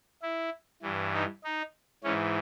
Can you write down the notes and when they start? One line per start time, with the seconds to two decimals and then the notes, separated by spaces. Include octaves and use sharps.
0.22 E4
0.82 G2 E3
1.14 D#4
1.44 D#4
2.04 G#2 E3 C#4